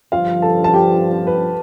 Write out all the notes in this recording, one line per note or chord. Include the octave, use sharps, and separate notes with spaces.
G1 G2 F3 F4 F5
A4 A5
A5
G4 G5
B4